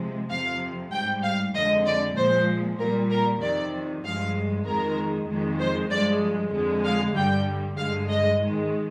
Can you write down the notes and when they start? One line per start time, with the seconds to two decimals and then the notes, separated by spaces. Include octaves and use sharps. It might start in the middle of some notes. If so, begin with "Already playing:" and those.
Already playing: C3 F3 G#3
0.30 F2 C3 F3 F5
0.92 G#2 G3 G5
1.23 F5
1.55 F2 D3 G#3 D#5
1.86 D5
2.17 A#2 F3 G#3 C5
2.79 A#2 G3 A#4
3.10 A#4
3.41 F2 C3 D#3 D5
4.04 G2 F3 G#3 F5
4.66 F2 D#3 G#3 A#4
5.29 F2 D#3 G#3
5.60 C5
5.90 G2 F3 G#3 D5
6.54 F2 D3 G#3
6.85 F5
7.15 G2 D3 G3 G5
7.77 G2 D3 G#3 F5
8.09 D#5
8.40 G#2 D#3 G#3